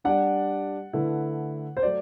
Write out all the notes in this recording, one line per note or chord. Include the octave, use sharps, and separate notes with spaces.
G3 D4 G4 D5 F#5
D3 A3 E4 B4
C5
F#3 A3 D5